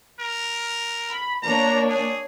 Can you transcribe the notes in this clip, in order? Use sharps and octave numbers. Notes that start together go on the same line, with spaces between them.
A#4
B5
A#3 D4 C#5 A#5
G#4